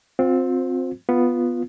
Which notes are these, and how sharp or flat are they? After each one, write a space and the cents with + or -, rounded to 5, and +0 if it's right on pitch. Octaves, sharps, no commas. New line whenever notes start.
C4 +0 F4 +35 C5 +0
B3 +0 F4 +0